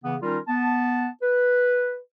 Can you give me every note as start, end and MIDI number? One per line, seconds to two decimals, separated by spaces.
0.04 0.16 49
0.04 0.16 52
0.04 0.16 59
0.22 0.38 51
0.22 0.38 55
0.22 0.38 61
0.22 0.38 63
0.22 0.38 65
0.22 0.38 70
0.48 1.07 59
0.48 1.07 81
1.22 1.98 71